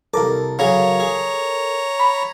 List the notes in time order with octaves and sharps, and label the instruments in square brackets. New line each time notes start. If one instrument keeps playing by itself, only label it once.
[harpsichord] C2 D6 [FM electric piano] A4 A#4
[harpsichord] C#3 F#3 G#4 [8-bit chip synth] C#5 A#5
[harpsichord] G#4
[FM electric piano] B5